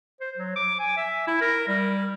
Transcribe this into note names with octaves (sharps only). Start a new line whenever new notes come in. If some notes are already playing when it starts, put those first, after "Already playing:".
C5
F#3
D6
G#5
E5
E4
A#4
G3